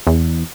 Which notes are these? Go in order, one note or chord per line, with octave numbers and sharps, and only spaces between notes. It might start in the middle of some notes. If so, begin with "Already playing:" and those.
E2